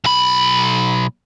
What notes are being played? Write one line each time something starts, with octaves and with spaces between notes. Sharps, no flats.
B1 B5